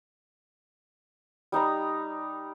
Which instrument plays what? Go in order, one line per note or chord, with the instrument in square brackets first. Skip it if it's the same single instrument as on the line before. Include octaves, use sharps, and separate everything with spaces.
[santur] G3 D#4 A#5 D#6